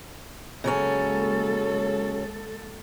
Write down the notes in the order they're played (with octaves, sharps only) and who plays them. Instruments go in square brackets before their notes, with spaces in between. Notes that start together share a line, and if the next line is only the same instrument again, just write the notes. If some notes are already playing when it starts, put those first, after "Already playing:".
[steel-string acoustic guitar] C#3 F#3 C#4 [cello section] G#3 A#3 A4